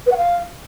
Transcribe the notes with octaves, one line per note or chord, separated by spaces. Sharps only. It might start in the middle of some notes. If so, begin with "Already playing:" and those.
B4
F#5
F5